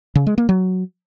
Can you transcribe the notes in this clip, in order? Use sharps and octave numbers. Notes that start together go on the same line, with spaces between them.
C#3
G#3
A#3
F#3